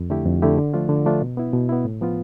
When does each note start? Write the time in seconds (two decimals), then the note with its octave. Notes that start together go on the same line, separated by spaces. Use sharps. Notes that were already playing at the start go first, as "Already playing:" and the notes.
Already playing: F2
0.10 D3 A3 E4 G4
0.26 F2
0.42 D3 A3 E4 G4
0.58 D3
0.74 F3 A3 D4 F4
0.89 D3
1.05 F3 A3 D4 F4
1.22 B2
1.37 B3 E4
1.54 B2
1.69 B3 E4
1.85 A2
2.01 F3 B3 F4